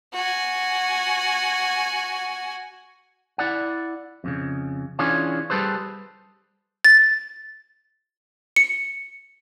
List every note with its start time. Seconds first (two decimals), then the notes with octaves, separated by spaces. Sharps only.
0.13 F#4 G#5
3.38 E4 D5 F#5
4.24 F2 A#2 C#3
4.99 E3 C#4 D4 F4 G#4 C#5
5.50 G3 G#4 A4 B4 C5
6.85 A6
8.56 C#7